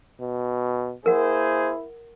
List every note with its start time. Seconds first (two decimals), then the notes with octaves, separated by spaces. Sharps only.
0.21 B2
1.06 A#3 E4 G#4 A#4 C5 F#5